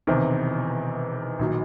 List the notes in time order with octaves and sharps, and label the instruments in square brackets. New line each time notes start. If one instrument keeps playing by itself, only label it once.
[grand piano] E1 E2 C3 D#3
A#1 D#3 F#3